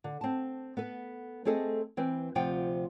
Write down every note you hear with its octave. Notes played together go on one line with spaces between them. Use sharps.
D3
C4 A5
B3 A4 B4
A3 C4 G#4 A4 D#5
E3 C4 B4
D2 C3 F3 F4 F#5 G5